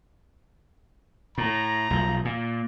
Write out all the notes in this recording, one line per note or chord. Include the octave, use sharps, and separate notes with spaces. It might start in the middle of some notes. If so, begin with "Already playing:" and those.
A2 A#5
B1 F3
A#2